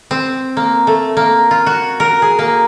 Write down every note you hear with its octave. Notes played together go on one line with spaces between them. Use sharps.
C4
A#3
A3
A#3
F4
F#4
A#4
G#4
A#3